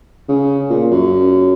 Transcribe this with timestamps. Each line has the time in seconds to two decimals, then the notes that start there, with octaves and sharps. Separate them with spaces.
0.28 C#3
0.70 A#2
0.91 F#2